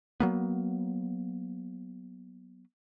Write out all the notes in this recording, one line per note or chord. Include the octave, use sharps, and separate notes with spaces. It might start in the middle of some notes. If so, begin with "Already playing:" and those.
F#3 A#3 B3